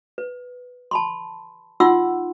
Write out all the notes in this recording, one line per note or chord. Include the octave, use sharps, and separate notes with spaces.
B4
A5 B5 C6
D#4 F4 F#5 C6 E6